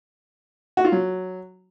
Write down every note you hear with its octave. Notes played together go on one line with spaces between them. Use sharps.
F#4
F4
F#3